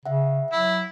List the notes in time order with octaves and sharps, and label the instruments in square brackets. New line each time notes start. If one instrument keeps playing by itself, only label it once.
[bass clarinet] C#3 [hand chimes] E5 F#5
[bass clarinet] F#3 [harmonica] E4